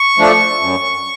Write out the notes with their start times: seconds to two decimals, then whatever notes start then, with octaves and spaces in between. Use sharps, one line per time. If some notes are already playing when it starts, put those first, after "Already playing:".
Already playing: C#6
0.18 F3 A3 D4
0.61 F#2